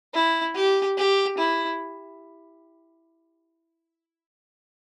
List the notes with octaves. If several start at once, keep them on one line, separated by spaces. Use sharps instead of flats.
E4
G4
G4
E4